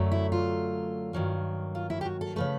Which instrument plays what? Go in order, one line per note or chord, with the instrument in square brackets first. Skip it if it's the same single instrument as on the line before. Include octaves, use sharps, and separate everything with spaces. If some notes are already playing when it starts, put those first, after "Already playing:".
Already playing: [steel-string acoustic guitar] F#2 D3 F#3 A3
E4
F4
G2 D#3 F#3 A#3
F4
E4
G4
F#4
A4
C#3 F3 A3 B4